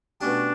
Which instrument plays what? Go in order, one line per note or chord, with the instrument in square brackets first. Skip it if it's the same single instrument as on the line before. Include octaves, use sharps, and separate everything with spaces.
[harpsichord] B2 A3 C#4 G4 [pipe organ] D4